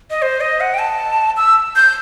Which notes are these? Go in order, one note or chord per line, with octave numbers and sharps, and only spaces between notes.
D#5
C5
D#5
F#5
G5
A5
E6
G6